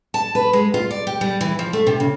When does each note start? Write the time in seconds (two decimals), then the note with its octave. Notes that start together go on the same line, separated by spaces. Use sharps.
0.14 A5
0.35 B4
0.53 G#3
0.74 F4
0.91 D5
1.07 G4
1.21 G3
1.41 E3
1.59 F3
1.73 A3
1.87 C3
2.00 C#3